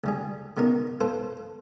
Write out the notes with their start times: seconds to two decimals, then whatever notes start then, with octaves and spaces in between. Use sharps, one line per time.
0.04 C#2 G3 G#4
0.57 C#3 B3 D#4 A#4
1.01 F4 A4 B4 C5